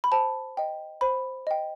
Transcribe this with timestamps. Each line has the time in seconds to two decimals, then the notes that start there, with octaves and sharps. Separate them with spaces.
0.04 B5
0.12 C5 A5
0.57 D#5 G5
1.01 C5 B5
1.47 D#5 G5